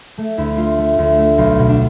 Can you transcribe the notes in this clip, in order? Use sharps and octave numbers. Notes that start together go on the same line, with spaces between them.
A3
D2 E4
A3 F4
A3
D2
A3
B1 F4
B2
D4